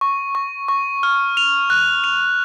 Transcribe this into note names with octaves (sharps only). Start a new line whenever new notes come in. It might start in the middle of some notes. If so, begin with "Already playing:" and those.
C#6
C#6
C#6
F6
F7
F#6
F7